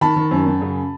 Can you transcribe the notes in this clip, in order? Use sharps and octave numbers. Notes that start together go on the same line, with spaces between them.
D#3 A5 B5
D#3
F#2
F#2
C#3